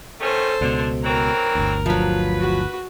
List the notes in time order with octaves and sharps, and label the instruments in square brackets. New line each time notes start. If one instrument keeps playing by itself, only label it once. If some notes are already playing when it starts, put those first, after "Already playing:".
[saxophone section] D#3 A3 C#4 [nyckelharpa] A4 C5
[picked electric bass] C#2 B2 [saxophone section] D3
[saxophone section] E3 F#3 C4 [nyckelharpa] A#4 A#5
[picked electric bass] G1 D2
[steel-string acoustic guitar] F3 F#3 [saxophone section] B4
[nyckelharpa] F#4